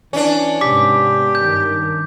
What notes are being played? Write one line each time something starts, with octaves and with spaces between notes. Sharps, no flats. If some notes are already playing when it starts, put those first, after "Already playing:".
E3 C#4 D4
G#2 C3 B3 G4 D6 B6
G2 D#3 G6